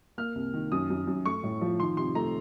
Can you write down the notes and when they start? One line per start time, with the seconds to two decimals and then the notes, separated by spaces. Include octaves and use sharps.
0.18 A#3 F6
0.35 C2
0.54 D#3
0.72 F#2 D#6
0.90 F#2
1.07 F#2
1.25 A3 C#6
1.44 A2
1.61 F3
1.80 D#3 C6
1.97 C3 C6
2.15 A3 A#5